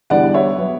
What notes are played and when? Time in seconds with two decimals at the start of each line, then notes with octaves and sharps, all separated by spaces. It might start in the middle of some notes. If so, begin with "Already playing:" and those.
0.10 E2 D3 G3 D5 F#5
0.34 C#5 E5
0.57 F#3 B3